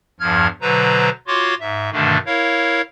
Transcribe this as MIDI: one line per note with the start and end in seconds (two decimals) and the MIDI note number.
0.20 0.47 40
0.20 0.47 43
0.20 0.47 53
0.20 0.47 89
0.20 0.47 92
0.61 1.09 47
0.61 1.09 50
0.61 1.09 54
0.61 1.09 71
0.61 1.09 72
0.61 1.09 82
1.27 1.55 65
1.27 1.55 66
1.27 1.55 73
1.27 1.55 84
1.27 1.55 86
1.60 1.90 44
1.60 1.90 76
1.92 2.18 43
1.92 2.18 47
1.92 2.18 50
1.92 2.18 51
1.92 2.18 57
1.92 2.18 62
2.26 2.81 64
2.26 2.81 70
2.26 2.81 73
2.26 2.81 77